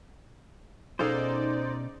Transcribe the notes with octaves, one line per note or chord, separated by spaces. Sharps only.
B2 C#4 D#4 G#4 A4 C5 D5 F5